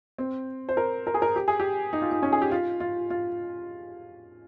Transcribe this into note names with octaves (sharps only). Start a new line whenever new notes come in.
C4
C5
A#4
A#4
G#4
A#4
G4
G#4
G4
D#4
F4
D#4
C#4
G#4
G4
F4
F4
F4